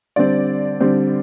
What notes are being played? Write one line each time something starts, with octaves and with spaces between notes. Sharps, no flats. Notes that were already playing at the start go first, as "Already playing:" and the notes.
D3 G3 C4 D5
D3 G3 C4